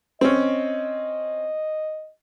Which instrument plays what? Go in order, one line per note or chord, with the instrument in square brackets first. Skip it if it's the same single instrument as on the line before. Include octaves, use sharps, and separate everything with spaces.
[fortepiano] C4 C#4 [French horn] D#5